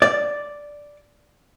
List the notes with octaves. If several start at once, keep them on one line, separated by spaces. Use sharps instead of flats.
D5